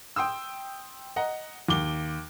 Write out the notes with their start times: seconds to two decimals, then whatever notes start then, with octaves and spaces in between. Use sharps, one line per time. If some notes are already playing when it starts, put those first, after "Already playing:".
0.16 G5 C6 D#6 E6
1.16 D#5 F#5 A#5
1.68 D#2 D6 G7